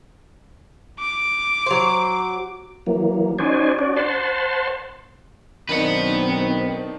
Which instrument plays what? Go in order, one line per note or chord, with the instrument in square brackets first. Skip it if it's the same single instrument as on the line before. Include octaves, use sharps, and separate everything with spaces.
[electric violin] D6
[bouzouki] F#3 C5
[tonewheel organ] E3 F#3 A#3
C#4 D#4 F#4 C5 D5 G#5
C#4 D4 F#4 D5
C5 F#5 A5 C6
[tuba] B1 [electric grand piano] D#3 D4 D#4 [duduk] C4 [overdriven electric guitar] B4 F#5